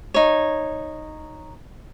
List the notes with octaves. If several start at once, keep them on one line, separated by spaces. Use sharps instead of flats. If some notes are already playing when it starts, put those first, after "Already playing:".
D#4 C#5